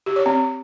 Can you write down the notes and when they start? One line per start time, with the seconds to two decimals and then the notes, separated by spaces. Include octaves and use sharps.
0.06 G4
0.16 C#5
0.26 C4